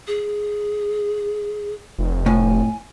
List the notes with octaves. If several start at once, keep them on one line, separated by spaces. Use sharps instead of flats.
G#4
F1
A2 G#5